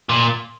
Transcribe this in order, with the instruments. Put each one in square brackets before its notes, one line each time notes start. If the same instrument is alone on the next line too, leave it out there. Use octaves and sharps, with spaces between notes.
[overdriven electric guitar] A#2